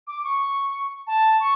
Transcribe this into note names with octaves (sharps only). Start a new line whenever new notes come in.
D6
C#6
A5
C#6